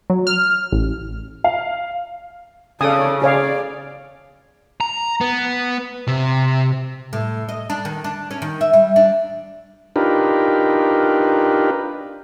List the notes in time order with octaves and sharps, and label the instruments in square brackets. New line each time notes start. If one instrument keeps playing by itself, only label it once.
[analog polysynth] F#3
F6
A1
[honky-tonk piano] F5
[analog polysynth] C#3 [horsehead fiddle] A4 D5 [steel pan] D#6
[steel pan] G#4 C#5 F5 [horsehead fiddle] D5
[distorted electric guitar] A#5
B3
C3
[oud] A2
D#5
D4
D#3
D4
C#4
D#3
E5
G3
D4
[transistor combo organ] D4 D#4 F4 G4 A#4 B4